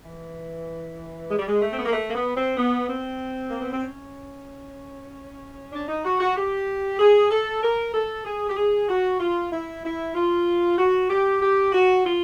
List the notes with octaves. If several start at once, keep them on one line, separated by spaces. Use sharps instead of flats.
E3
G#3
G3
G#3
A3
C4
B3
A#3
A3
A#3
B3
C4
B3
C4
A#3
B3
C4
C#4
D4
D#4
F#4
F#4
G4
G#4
A4
A#4
A4
G#4
G4
G#4
F#4
F4
E4
E4
F4
F#4
G4
G4
F#4
F4